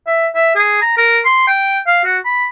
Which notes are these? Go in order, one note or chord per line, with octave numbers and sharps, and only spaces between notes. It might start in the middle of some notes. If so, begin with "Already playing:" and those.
E5
E5
G#4
A#5
A#4
C6
G5
F5
F#4
B5